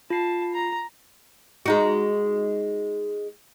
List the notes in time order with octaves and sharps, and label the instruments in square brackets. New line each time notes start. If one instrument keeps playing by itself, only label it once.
[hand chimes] F4 C7 [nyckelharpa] A5
[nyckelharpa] A#5
[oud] G#3 D#4 F#4